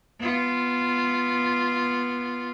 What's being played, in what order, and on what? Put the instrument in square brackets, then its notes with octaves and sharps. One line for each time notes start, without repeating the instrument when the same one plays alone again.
[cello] B3 F4